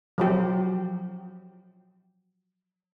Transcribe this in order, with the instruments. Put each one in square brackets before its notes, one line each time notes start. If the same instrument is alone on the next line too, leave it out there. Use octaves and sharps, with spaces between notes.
[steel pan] F3 F#3 G4